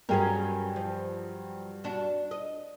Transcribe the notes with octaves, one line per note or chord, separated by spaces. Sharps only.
G2 F#3 C#4 G#4 A#4 G5
F3
D4 F#4
D#5